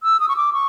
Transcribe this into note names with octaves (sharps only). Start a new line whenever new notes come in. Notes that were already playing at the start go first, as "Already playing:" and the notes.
E6
D#6
C#6
D6
C#6